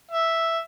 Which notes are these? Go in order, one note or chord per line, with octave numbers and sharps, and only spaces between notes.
E5